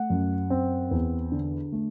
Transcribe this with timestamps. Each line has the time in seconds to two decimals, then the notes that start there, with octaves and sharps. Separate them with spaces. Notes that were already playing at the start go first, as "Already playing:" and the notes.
Already playing: A3 F#5
0.10 F#2
0.50 C4
0.91 E2
1.32 D3
1.72 A3